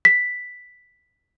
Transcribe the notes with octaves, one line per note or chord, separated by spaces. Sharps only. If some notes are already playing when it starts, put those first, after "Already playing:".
B6